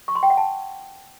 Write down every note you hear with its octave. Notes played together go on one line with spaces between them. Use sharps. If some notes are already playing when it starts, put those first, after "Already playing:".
C#6
C6
G5
F#5
A5